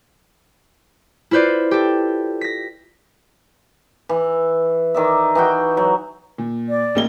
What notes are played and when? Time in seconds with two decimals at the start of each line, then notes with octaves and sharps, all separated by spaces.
1.31 E4 F4 B4 C5 D5
1.71 G4 A4
2.41 A#6 B6
4.09 E3
4.94 D#3 D5 E5
5.35 E3 D#4 F#4 G5
5.77 F#3
6.38 A#2
6.69 D5
6.95 A1 A#3 G7